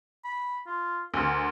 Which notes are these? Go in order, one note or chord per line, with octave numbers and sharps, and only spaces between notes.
B5
F4
D2 A#4